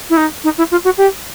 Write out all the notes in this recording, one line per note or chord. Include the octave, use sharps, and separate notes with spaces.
E4
D#4
D#4
E4
F4
F#4
G4